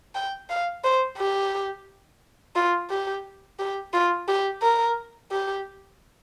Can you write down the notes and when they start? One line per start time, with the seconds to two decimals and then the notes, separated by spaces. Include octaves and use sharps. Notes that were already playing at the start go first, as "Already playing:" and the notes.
0.15 G5
0.50 F5
0.84 C5
1.18 G4
2.56 F4
2.90 G4
3.59 G4
3.93 F4
4.28 G4
4.62 A#4
5.31 G4